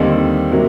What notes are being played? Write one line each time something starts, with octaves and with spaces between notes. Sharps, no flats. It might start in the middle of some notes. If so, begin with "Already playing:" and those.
Already playing: D#2 D3 G3 C4 D#4
C3 F#3 A#3